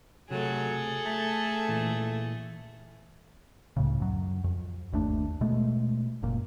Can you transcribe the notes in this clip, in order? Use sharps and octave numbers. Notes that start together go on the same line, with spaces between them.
C3 F#3 A3 G#4 A4
A3 A5
A#2 E3
C#2 A2 C#3
F#2 F#3
F2
G1 D#2 A3 D4
B2 G#3 A3
F#1 A#2